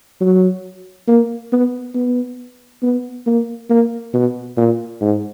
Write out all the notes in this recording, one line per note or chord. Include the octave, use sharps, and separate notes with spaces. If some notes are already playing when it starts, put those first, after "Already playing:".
F#3
A#3
B3
B3
B3
A#3
A#3
B2
A#2
G#2